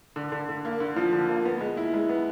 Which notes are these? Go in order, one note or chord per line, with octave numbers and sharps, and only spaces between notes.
D3
D3
D3
A#3
D3
F3
D3
A#3
B3
G#3
E4
G#3
B3